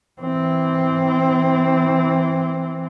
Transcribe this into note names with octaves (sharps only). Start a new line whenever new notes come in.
E3 C4